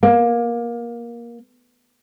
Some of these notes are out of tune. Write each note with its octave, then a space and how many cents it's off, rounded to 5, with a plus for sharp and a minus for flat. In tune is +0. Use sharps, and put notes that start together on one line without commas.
A#3 +20